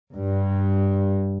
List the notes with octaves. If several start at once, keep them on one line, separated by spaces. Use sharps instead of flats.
G2